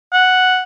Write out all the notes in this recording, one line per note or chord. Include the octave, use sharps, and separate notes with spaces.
F#5